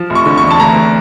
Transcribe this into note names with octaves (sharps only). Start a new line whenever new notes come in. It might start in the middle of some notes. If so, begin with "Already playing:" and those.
Already playing: F3
F1
C#6
D3
C#6
E2
A5
D2 A#5
D2